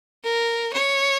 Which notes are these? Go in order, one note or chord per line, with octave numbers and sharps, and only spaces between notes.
A#4
C#5